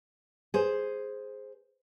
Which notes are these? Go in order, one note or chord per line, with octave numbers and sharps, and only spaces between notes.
G#4 C5